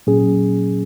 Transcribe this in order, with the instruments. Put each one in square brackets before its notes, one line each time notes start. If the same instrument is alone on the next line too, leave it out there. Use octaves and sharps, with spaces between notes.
[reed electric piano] A#2 F#3 C#4 G#4